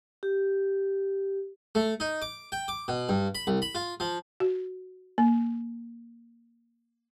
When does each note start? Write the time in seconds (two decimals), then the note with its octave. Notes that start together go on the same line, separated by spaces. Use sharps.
0.23 G4
1.75 A3
2.00 D#4
2.22 D6
2.52 G5
2.68 D6
2.88 B2
3.09 G2
3.35 B5
3.47 C2
3.62 B5
3.75 F4
4.00 F3
4.40 F#4
5.18 A#3